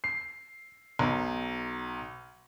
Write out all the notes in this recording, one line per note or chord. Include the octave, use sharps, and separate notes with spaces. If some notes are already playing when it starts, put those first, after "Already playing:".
C7
B1